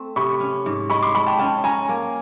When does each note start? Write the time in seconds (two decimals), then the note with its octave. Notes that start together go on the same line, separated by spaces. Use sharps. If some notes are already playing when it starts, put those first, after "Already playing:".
Already playing: A3 C4
0.16 C3 B5 C#6
0.40 C#4
0.66 G#2
0.90 G#3 B5 C#6
1.03 C6 D6
1.15 G#3 B5 C#6
1.27 G5 A5
1.39 C#4 G5 A5
1.64 C#4 G#5 A#5
1.89 A#3